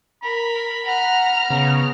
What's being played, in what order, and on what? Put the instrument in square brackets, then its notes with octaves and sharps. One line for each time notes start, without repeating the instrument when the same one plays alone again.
[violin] A#4 [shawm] B5
[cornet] F#5 [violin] A#5 F6
[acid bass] C#3 [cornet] B3